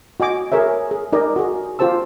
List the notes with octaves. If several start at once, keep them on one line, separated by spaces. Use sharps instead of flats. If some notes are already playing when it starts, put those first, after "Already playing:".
F#4 D#5 G#5 D6
G#4 A#4 C#5 E5
G#4
D#4 G4 A#4 D5 D#5
F#4 G#4
F4 G4 C5 A5 E6